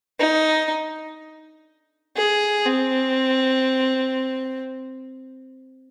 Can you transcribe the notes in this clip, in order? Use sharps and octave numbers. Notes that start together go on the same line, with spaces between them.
D#4
G#4
C4